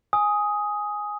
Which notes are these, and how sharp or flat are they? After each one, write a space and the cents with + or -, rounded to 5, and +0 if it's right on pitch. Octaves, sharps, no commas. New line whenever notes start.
G#5 +0 D#6 +10